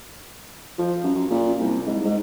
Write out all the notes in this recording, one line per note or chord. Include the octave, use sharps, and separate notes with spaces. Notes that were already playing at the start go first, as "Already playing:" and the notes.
F3
F#2
F#2
A#2
C2
G#2
G#2